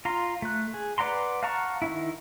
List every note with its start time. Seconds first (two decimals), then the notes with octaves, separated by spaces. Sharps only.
0.05 F4 A#5 C6
0.42 A3 F#6
0.74 G#4
0.98 B4 D5 F#5 A#5 C6
1.43 F5 F#5 A5 A#5 C#6
1.82 D#3 C#4 E4